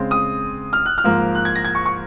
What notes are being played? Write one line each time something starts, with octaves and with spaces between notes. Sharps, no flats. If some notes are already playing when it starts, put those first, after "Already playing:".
Already playing: C#3 G#3 C4
D#6
F6
F#6
F6
G#2 F3 A#3
F#6
G#6
A#6
G#6
C#6
C#6